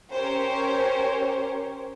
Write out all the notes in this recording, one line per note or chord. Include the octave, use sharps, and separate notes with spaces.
C#4 G4 A#4 C5 C#5